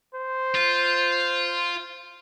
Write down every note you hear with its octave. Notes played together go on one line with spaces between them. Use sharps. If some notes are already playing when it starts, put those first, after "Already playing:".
C5
F4